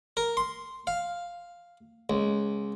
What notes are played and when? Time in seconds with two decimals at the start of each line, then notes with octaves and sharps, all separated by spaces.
0.17 A#4
0.37 C6
0.87 F5
2.10 C#2